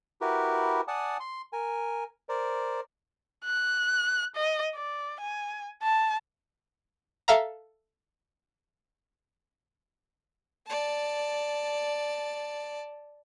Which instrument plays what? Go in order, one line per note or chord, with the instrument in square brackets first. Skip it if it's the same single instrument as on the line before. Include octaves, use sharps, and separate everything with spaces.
[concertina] E4 F#4 G4 A#4 B4
D5 F#5 G#5 A5 D#6
C6
A#4 G#5
A#4 C5 D5
[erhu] F#6
D#5
D5
G#5
A5
[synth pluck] A4 E5 F5 A#5
[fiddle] D5 A5